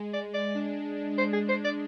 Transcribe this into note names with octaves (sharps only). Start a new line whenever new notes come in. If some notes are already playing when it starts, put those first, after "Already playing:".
Already playing: G#3
D5
D5
D4
C5
G#4
C5
D5